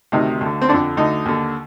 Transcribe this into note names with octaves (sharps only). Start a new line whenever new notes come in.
D2 C3 D#3 D#4
D2 D3
C4
F2 D3 D4
D2 D3 D#4
D#2 D3